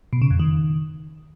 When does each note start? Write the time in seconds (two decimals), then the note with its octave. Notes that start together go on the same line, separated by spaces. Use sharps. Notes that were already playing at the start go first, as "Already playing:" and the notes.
0.13 B2
0.22 C#3
0.31 F2
0.40 D#3